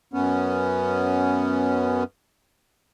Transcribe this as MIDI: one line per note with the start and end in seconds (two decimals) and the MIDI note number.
0.14 2.04 42
0.14 2.04 59
0.14 2.04 61